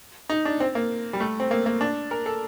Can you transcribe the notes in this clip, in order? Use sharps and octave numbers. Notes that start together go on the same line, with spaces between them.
D#4
D4
C4
A#3
G3
A3
C4
A#3
A#3
D4
A#4
A4